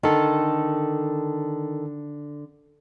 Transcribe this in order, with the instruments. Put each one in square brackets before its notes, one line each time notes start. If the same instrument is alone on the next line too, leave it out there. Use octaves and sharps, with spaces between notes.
[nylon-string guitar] D3 [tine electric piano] D#3 A4